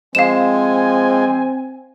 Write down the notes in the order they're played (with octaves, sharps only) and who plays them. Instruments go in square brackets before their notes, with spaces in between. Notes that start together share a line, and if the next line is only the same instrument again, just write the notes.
[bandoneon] F3 G#3 [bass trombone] C4 [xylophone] F5 E7 [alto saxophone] G#5